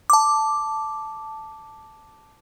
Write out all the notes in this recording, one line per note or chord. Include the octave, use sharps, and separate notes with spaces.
A5 D6